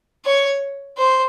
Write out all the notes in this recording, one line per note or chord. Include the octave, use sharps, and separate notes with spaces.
C#5
C5